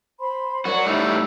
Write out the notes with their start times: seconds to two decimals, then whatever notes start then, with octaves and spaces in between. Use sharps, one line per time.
0.20 C5 B5 C6
0.65 F#3 F#4 A#4 D5 F#5
0.85 A2 G3 D#4 D#5 E5 E6